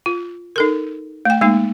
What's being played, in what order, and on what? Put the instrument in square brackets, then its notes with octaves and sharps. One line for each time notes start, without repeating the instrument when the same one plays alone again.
[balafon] F4
D#4 A4 A#4
A3 G5
G#3 A#3 D#4